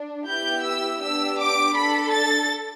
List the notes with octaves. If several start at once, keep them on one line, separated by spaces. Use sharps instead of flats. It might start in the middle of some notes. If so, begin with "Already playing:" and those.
Already playing: D4
B3 E4 G4 G6
E6
B3 D4 G4 E6
D6
D4 A4 B5
A6